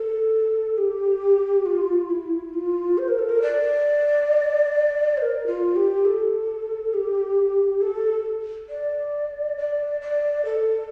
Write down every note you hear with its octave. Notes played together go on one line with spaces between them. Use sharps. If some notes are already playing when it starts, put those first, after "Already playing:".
Already playing: A4
G4
F4
E4
F4
C5
A#4
A4
A#4
D5
C5
A#4
F4
G4
A4
G4
A4
D5
D5
D5
A4